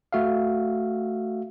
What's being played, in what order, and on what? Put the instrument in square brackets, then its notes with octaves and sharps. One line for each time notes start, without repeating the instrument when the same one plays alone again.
[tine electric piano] A3 F#4 E5 F5